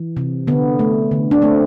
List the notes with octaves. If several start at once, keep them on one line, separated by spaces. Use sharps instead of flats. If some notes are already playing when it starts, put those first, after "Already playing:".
Already playing: E3
C3
D3 B3
A3
D3
D4
A3 C4